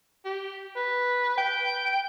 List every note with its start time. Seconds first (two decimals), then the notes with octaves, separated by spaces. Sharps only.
0.25 G4
0.76 B4
1.37 G5